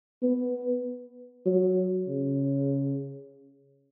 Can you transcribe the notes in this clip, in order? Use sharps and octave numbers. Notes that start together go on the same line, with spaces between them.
B3
F#3
C#3